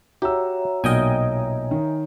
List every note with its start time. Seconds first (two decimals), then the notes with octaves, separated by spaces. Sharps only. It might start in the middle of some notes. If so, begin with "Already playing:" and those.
0.22 F#4 G4 C#5 E5 A#5 E6
0.84 B1 A#2 D#5 G5 G#5
1.71 D#3